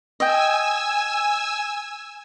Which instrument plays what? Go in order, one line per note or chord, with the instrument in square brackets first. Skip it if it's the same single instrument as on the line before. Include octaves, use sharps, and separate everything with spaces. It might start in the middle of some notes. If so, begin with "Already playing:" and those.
[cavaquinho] D#5 G5 [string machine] G#5 E6